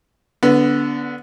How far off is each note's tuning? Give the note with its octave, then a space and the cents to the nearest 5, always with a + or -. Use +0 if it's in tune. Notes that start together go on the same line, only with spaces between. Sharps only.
D3 -15 B3 +0